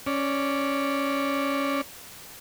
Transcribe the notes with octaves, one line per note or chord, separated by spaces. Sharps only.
C#4 D5